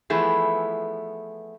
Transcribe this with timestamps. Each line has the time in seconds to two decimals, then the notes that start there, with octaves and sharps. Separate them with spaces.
0.10 E3 F3 A3 B3 E4 G#4